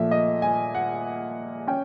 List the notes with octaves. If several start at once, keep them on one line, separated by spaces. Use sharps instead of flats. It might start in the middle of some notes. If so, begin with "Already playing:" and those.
Already playing: A#2 F3 A3 E5
D#5
G#5
F#5
C#4 G5